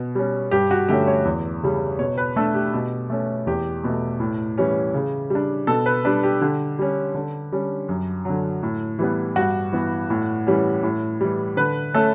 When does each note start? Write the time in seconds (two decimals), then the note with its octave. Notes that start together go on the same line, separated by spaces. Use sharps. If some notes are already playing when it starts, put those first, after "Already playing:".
Already playing: B2
0.15 G3 C#4
0.51 G2 G4
0.71 F#4
0.89 D3 A3 C#4 G4
1.07 C#5
1.25 E2
1.63 C#3 G3 C#4
1.99 B2 C#5
2.17 B4
2.36 A3 D4 A4
2.54 G4
2.74 B2
3.10 A3 C#4
3.47 E2 G4
3.84 B2 A3
4.20 A2
4.58 E3 G3 C#4
4.94 C#3
5.30 G3 D4
5.67 B2 A4
5.86 B4
6.05 G3 D4 B4
6.23 G4
6.41 D3 G4
6.79 G3 C#4
7.15 D3
7.52 G3 C#4
7.89 F#2
8.25 D3 F#3
8.63 A2
8.99 E3 G3 B3
9.36 G2 F#4
9.73 E3 B3
10.10 A2
10.47 E3 G3 C#4
10.83 A2
11.21 E3 G3
11.57 D3 B4
11.94 A3 C#4 A4